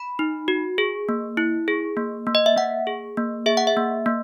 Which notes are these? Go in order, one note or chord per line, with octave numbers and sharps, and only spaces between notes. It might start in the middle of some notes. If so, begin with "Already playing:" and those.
Already playing: B5
D#4
F#4
G#4
A#3
E4
G#4
A#3
A#3
D#5
E5
A#3 F#5
G#4
A#3
G#4 E5
F#5
E5
A#3
A#3